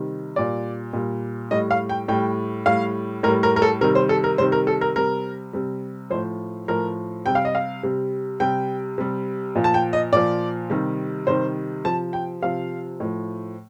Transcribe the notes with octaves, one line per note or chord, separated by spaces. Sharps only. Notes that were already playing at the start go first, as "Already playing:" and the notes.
Already playing: C3 D#3 G3
A#2 G3 D5
A#2 G3
A2 G3 D#5
F5
G5
A2 G3 G5
A2 G3 F5
A2 G3 A#4
A#4
A#4
A4
C3 D#3 G3 A#4
C5
A4
A#4
C3 D#3 G3 C5
A#4
A4
A#4
C3 G3 A#4
C3 G3
A2 F3 C5
A2 F3 A#4
C3 G3 G5
F5
D#5
F5
C3 G3
C3 G3 G5
C3 G3
A#2 F3
A5
G5
D#5
A#2 F3 D5
C3 D#3 G3
C3 D#3 G3 C5
C3 F3 A5
G5
C3 F3 F5
A2 F3